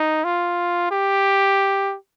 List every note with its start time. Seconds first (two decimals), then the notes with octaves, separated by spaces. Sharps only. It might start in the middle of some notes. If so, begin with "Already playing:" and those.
Already playing: D#4
0.25 F4
0.91 G4